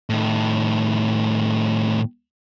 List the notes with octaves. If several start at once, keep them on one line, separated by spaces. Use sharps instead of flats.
A2 D#3